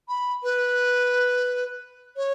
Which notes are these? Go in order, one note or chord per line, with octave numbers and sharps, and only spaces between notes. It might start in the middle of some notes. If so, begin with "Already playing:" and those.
B5
B4
C#5